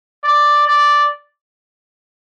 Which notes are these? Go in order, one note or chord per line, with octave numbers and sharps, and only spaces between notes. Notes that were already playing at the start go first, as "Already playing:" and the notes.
D5
D5